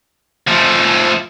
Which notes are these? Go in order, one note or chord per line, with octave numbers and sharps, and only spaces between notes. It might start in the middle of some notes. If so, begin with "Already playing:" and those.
F3 A3